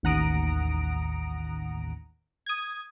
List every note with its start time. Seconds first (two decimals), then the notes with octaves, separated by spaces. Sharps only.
0.03 A1 D#2 F#5 A#5 D#6 D7
2.46 D#6 G#6